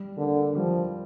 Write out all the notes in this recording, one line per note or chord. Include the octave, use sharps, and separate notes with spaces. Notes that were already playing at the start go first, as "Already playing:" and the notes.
Already playing: G3
D3 A#3
F3 G3